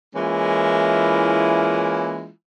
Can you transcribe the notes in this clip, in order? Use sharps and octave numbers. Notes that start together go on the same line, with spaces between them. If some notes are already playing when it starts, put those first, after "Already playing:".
E3 G#3 A#3 C#4 E4 F4